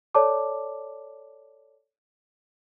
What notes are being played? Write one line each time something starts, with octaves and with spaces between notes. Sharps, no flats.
A4 C#5 D5 A5 D6